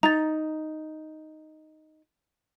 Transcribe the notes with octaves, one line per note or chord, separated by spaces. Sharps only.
D#4 A#5 A6